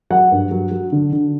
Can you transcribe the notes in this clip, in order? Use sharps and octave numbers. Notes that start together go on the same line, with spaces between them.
F#3 F#5
G2
F#3
F#3
D3
D3